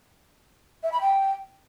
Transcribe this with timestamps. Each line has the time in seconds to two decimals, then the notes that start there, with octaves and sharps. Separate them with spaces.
0.83 E5
0.92 B5
1.01 G5